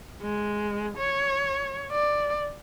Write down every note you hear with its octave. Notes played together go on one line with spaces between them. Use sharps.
G#3
C#5
D5